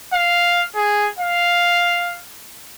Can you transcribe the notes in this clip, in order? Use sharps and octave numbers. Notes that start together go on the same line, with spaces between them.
F5
G#4
F5